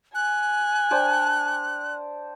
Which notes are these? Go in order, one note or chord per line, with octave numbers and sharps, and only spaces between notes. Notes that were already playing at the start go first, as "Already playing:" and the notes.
G#5 F#6
D4 C5 G5